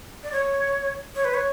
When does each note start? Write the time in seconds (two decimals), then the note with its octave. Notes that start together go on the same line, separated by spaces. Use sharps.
0.23 D5
0.32 C#5
1.15 C#5
1.24 B4
1.34 C#5